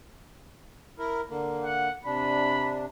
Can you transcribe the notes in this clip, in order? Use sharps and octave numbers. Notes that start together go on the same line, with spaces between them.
E4 A#4
D3 A#3
F#5
C3 D4 B5